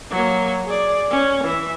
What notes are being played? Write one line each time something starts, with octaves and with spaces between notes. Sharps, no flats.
F#3 A#3
G#4 D5
C#4
E3 E5